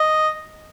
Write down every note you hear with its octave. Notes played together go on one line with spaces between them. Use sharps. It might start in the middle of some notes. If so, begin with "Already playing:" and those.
Already playing: D#5